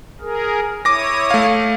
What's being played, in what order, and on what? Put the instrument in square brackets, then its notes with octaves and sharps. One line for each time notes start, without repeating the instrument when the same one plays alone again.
[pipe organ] G#4 A#4
[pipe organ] E4 C#5 D#6 [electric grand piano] D6 A#6
[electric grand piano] A3 F5